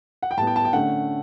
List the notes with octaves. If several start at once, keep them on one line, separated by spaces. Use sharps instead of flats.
F#5
G5
A2 G3 B3 A5
G5
A5
G5
D3 A3 C#4 F#5